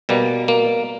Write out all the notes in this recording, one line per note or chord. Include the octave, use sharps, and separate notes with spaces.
B2 G3 A#3
A#3